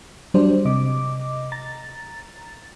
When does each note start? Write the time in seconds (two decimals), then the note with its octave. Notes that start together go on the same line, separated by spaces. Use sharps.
0.34 F#3 G3 D4 C5 D5
0.65 C3 D#5 D6
1.52 A#5 A6